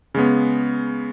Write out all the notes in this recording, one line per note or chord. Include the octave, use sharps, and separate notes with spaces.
C#3 G#3 B3